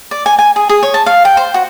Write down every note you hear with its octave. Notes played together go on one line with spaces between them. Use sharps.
D5
G#5
G#5
G#4
G#4
C#5
A5
F5
G5
C5
F#4